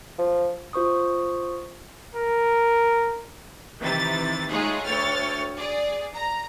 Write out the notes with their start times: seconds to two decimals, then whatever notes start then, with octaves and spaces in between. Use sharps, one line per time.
0.18 F3
0.73 F4 C5 C#6 D#6
2.14 A#4
3.81 C3 D#3 E3 A6
4.50 G#3 A3 D#4 F4 G#4 C#5
4.85 D2 C#5 G5 F6 A6
5.57 G#4 D5
6.14 A#5